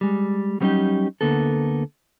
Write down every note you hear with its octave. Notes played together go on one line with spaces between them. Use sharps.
G3 G#3
F#3 G3 B3 C#4 D#4 G4
D2 D3 A#3 B3 A4